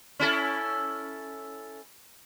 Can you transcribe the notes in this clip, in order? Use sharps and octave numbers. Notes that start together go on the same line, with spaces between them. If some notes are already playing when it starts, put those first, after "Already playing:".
C#4 E4 A4